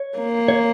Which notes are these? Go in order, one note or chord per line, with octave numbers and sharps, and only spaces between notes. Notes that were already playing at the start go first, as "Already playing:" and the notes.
Already playing: C#5
A#3
C#5